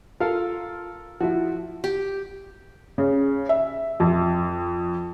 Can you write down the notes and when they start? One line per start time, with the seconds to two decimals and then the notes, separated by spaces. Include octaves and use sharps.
0.20 F4 A4 A#4 F5
1.20 F3 E4 F#4
1.84 G4
2.98 C#3
3.49 E5
4.00 F2